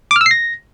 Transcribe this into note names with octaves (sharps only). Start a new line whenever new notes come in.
D6
F6
E6
C7
A#6